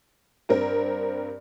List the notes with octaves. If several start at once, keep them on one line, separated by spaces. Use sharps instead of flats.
G2 C4 A#4